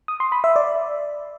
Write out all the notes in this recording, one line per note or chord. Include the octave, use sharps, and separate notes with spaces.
D#6
C6
B5
E5
D5